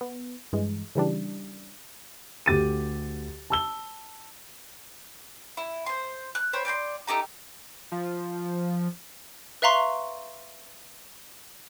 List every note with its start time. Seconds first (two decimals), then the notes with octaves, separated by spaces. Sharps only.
0.01 B3
0.53 G2 E3 G#3
0.95 C#3 E3 G3 D4
2.46 D2 G4 A6 D#7
3.50 A5 E6 G7
5.57 E4
5.86 C5 C6
6.35 F#6
6.53 C5 C#5 G5 B5
6.65 D5 G5 A#5 C6
7.07 A3 D#4 G4 A#5
7.92 F3
9.62 B4 E5 F5 A#5 C6 C#6